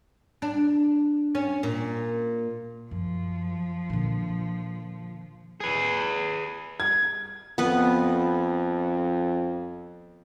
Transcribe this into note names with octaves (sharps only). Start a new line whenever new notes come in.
D4
C#4
A#2
F#2 F3
A#2 D3
G#4 B4
G#6
F2 B3 B4